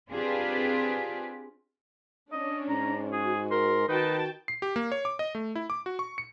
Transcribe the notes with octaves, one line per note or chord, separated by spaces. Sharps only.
C4 D4 F4 G4 G#4 B4
C#4 D4 D#5
G#2 A#5
F#4 G#4
A#4 C6
D#3 D#4 F#4 B4 G5 A5
C7
G4
A#3
C#5
D6
D#5
A3
E4
D6
F#4
C#6
C#7